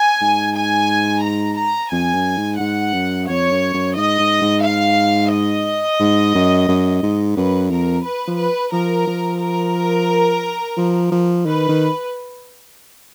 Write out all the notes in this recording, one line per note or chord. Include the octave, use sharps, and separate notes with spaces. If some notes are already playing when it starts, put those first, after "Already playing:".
Already playing: G#5
G#2
G#5
A#5
A#5
F2 G#5
F#2
G#2
G#2 F#5
F#2
F2 C#5
F#2
F#2
G#2 D#5
G#2
G#2
F5
D#5
G#2
F#2
F#2
G#2
F#2 B4
F2 A#4
B4
F3
B4
F3 A#4
F3
A#4
F3
F3
D#3 B4
D#3